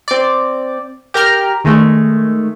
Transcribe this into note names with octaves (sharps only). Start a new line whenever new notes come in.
C4 D5
G4 A#4 G5 A#5 F6
D#3 G#3 A3